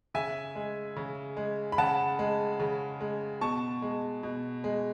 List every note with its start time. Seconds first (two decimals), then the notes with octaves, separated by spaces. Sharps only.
0.14 C#3 E5 G#5
0.55 G#3
0.96 C#3
1.37 G#3
1.72 B5
1.78 C#3 F#5 A5
2.19 G#3
2.60 C#3
3.01 G#3
3.41 B2 A5 C#6
3.82 G#3
4.23 B2
4.64 G#3